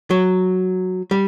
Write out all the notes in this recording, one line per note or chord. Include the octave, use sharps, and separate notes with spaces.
F#3
G3